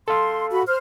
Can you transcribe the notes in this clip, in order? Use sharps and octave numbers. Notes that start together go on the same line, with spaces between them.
A4 F5 C6 E6
F#4 B5
C5 F6